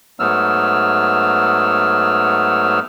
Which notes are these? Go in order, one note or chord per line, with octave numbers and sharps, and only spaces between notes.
G#2 F#3 A3 B3 E6 F6